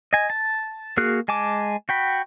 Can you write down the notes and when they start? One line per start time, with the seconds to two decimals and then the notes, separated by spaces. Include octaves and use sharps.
0.13 D#5 G#5
0.30 A5
0.97 A#3 F#4 G#4 F6 F#6
1.28 G#3 G#5 A5 D6
1.89 F#4 G5 B5